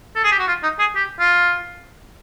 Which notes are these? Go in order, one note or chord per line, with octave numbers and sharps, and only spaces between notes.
A4
G#4
G4
F#4
F4
D#4
G#4
G4
F4